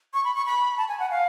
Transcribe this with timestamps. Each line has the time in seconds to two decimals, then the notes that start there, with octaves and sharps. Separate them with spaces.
0.14 C#6
0.24 B5
0.35 C#6
0.46 B5
0.78 A5
0.89 G#5
1.00 F#5
1.10 F5